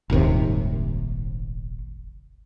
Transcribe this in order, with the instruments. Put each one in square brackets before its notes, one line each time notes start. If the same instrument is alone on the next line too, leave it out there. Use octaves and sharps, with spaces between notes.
[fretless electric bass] D#1 G#1 D#2 C3